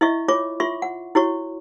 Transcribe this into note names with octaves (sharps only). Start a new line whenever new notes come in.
E4 D#5 E5 C#6
F4 C#5 D6
F4 E5 C6 C#6
F#5
E4 F#4 C#5 C#6